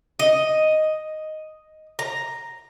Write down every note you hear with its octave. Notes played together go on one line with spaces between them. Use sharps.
D#5
A#5